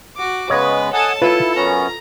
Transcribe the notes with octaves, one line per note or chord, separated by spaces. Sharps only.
F#4 D6
C#3 G#3 B3 B4 C#5 D#5
A4 F#5 G#5 A5 D#6
E4 F4 A4 B4
F#2 B3 C#4 A#5